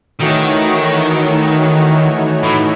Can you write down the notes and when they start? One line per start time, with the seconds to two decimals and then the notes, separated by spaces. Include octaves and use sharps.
0.20 D#3 E3 A3 D#4 F#4 C#5
2.44 A2